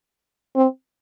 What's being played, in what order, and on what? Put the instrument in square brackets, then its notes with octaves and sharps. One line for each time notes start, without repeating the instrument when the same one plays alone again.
[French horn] C4